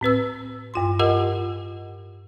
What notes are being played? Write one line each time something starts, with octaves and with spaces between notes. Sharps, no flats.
A2 C4 B4 E6
G2 F4 C6
F4 G4 A#4 D#5 F#5